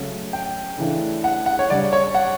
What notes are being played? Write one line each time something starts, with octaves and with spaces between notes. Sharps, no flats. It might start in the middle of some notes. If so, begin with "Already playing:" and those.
Already playing: C#3 F#3 A3 C#4
G5
C#3 E3 A3 D4
F#5
F#5
C#5
C#3 G3 D4 D5
C#5
F#5